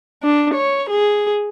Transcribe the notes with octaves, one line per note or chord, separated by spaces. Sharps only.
D4
C#5
G#4